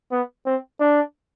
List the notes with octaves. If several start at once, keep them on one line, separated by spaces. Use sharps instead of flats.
B3
C4
D4